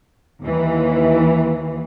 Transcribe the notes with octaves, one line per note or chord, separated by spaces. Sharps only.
D#2 E3